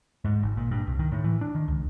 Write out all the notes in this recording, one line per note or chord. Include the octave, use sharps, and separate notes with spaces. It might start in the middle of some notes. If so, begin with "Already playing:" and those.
G#2
G#1
A#2
G2
C2
D#3
A2
E3
D4
D#3
C#2